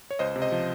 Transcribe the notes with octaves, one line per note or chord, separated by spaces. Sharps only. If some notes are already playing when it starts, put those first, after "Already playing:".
C#5
C#2 C5 D#5
C3
C5 D#5
F3